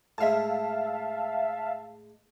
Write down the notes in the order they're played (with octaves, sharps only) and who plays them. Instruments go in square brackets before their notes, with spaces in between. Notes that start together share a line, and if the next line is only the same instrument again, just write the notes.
[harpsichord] A2 G#3 [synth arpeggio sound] E5 F5 A5